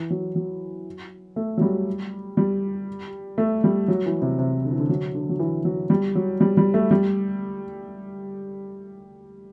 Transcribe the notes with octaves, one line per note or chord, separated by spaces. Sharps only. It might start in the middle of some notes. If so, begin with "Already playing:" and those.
Already playing: E3
F#3
F#3
A3
F#3
G3
G3
A3
G3
F#3
E3
C3
C3
D3
E3
D3
F#3
D3
F#3
E3
F#3
G3
F#3
G3
G3
A3
G3